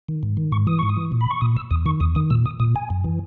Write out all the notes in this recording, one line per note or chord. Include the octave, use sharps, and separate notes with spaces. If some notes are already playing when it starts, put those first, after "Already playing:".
D#3
G#2
D#3
G#2 C#6
E3 D#6
G#2 C#6
D#6
E3
A#2
B5
C#6
A#2 D#6
E6
E2 D#6
D#3 C#6
E2 D#6
D#3 D#6
A#2 E6
D#6
A#2 D#6
G#5
F#2
E3